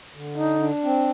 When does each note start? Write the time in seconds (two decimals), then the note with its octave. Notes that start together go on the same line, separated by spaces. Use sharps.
0.15 D3
0.37 D4 D#4
0.61 D4
0.84 C4